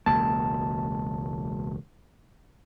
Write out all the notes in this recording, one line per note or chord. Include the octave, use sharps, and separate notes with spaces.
E1 C#2 A#3 A5